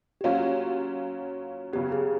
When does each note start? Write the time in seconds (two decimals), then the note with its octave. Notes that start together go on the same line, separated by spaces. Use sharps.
0.21 G4
0.24 F#3 A#3 C#4 F4 F#4
1.73 C#3 F#3 B3 G4
1.92 G#4